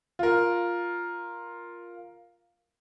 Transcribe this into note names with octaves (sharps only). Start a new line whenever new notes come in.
F4 A#4